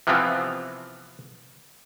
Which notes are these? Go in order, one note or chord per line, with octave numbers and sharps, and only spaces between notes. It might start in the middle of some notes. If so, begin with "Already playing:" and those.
C3 E3 F3 B3 C4 F4